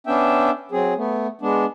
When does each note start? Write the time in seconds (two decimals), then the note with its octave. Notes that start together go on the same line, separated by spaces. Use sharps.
0.07 B3 C#4 D4 E5 G5
0.72 F#3 C4 G#4
0.97 A3 B3
1.42 G#3 B3 D4